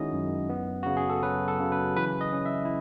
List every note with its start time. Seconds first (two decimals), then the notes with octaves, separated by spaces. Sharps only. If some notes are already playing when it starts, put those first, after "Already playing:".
Already playing: D#3 G#3 C#4 D#4 E4 F#4 G#4 D#5
0.13 F#2
0.49 B3
0.83 C#3 F#4
0.97 G#4
1.10 A4
1.23 F#3 B4
1.48 A4
1.60 C#3
1.72 B4
1.96 E3 B4
2.21 D#5
2.33 C#4
2.46 E5
2.65 E4